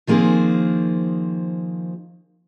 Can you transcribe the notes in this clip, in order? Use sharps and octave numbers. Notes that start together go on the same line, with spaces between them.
D#3 F3 A#3 C4 G#4